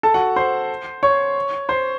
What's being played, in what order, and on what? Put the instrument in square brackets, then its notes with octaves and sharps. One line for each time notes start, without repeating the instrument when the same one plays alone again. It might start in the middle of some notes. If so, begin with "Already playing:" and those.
[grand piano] A4 A5
F#4 F#5
C5 C6
C#5 C#6
C5 C6